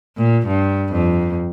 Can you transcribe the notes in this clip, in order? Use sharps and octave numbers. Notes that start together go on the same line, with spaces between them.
A#2
G2
F2